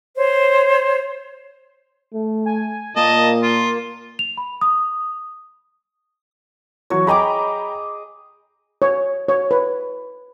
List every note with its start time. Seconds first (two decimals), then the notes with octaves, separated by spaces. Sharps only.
0.16 C5 C#5
2.14 A3
2.46 G#5
2.96 A#2 A#3 D#5 A5
3.43 F4
4.19 F7
4.37 B5
4.61 D#6
6.90 E3 F#3 C#5 C#6
7.07 G#4 D#5 G5 A#5 B5 D6
8.82 C#5
9.28 C#5
9.51 B4